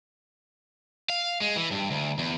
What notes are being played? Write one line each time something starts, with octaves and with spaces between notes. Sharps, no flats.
F5
G#3
E3
G2
D2
E2